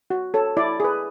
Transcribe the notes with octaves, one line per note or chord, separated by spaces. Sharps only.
F#4
A4 C#5
E4 D5
G#4 B4